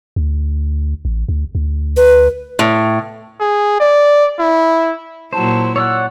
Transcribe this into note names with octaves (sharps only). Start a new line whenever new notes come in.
D2
A1
D2
D2
B4
A2
G#4
D5
E4
A#2 F#3 E4 C5 A5
C#5 D5 F#5 E6